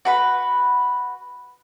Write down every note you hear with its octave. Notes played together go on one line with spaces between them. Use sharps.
F#4 B4 B5